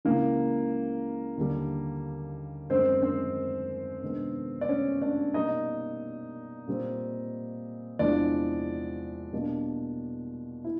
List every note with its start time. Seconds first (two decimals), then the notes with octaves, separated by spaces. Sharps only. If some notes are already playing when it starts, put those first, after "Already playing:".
0.05 C#2 C#3 E3 A#3 A#4
1.37 D#2 D3 G3
2.70 F#2 D#3 G#3 C4 C#4 C5
3.02 C4 C5
4.03 C3 D#3 G#3 B3 D4
4.61 D5
4.69 C#4 C#5
5.02 D4 D5
5.34 B2 G3 A#3 D#4 D#5
6.67 A#2 G3 C4
7.99 E2 C3 F3 G#3 D4 D5
9.33 B2 G3 A#3 D4
10.64 E4